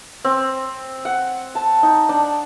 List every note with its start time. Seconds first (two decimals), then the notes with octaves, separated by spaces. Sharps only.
0.25 C4
1.05 F#5
1.55 A5
1.83 D#4
2.09 D4